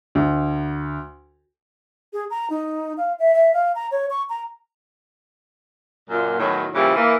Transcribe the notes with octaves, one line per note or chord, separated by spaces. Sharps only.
D2
G#4
A#5
D#4
F5
E5
E5
F5
A#5
C#5
C#6
A#5
F#2 A#2
E2 A2 D#3 F#3
A#2 C#3 E3 F3 G3
E3 A#3